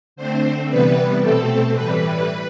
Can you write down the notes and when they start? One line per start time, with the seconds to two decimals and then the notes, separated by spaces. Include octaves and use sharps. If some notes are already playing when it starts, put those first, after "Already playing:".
0.16 D3 A3 C4 C5
0.69 C3 E3 G3 B3 B4
1.21 B2 A3 C4 A4
1.74 A2 E3 G3 B4